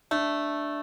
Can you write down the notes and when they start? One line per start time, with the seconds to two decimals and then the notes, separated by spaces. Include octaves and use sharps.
0.11 A3 D4